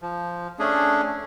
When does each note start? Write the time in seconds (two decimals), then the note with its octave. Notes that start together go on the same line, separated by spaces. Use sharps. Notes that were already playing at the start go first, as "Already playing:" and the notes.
0.02 F3
0.59 A3 C#4 D4 G#4